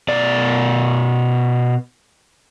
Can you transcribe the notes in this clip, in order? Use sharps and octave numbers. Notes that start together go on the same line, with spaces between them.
B2 D5